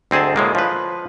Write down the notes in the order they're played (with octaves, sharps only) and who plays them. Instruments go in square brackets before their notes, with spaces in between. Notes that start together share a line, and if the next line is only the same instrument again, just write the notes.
[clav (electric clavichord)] D2 C4 G#4 D#5 A5
A2 G#3 A#3
F3 B4